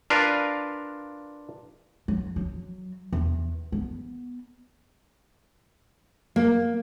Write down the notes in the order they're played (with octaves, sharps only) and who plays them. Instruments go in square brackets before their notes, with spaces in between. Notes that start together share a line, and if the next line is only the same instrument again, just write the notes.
[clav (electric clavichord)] D4 F4 A#4 B4 F5
[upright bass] F#3
F#3
E2
B3
[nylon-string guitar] A#3